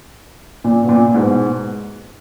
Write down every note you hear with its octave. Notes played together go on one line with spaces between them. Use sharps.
A#2
B2
A#2
G#2 B2